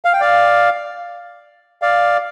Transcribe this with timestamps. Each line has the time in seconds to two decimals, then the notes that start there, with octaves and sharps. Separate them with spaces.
0.05 F5
0.13 G5
0.20 D5 F5
1.82 D5 F5